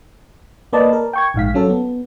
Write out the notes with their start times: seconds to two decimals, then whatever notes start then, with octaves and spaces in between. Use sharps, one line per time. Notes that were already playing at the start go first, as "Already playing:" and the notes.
0.73 A#3 B4 D5 D#5 A5
0.93 A#4
1.13 G5 C#6 G#6
1.34 A#1 G#2 F5 B6
1.54 F#3 C#4 A4
1.69 B3